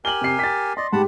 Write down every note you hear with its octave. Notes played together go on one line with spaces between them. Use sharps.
G4 A#4 G#5 F#7 G7
C3 C7
A6 B6
D5 D#5 C6
G#2 G4 F#5 A5 B5